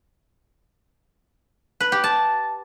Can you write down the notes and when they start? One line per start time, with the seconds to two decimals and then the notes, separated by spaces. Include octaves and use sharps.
1.80 B4
1.92 G4
2.04 A5